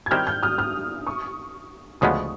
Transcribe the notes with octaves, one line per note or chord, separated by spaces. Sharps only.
G#6
D#3 G3 C4 E4 G4 F6 G6
F6 G6
D#6 F6
D#6 F6
C#6 D#6
D2 C#3 F3 G#3 B3 C#6 D#6